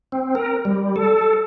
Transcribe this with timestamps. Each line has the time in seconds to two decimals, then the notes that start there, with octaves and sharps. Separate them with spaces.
0.12 C4
0.35 A#4
0.65 G3
0.96 A4